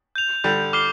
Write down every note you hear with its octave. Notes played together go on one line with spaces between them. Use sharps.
G6 F7
D3 G3 G6 F7
D6 F6 C7 G7